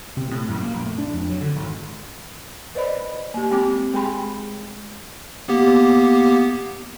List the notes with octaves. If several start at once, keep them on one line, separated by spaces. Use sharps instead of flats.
C3
A2
F#2
A#3
A#1
A3
D4
F2
F#3
D3
G#1
B4 C5 D5 D#5 B5
A#3 G4
G#3 C4 G4 D6
G#3 G#4 G5 G#5 B5 C6
A#3 B3 G4